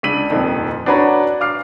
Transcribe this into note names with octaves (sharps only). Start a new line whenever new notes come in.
C#2 D4 B6 D#7 F#7
D#1 F2 D#3
D4 F#4 B4 C#5 A#5 D6
F5 D6 F6 C7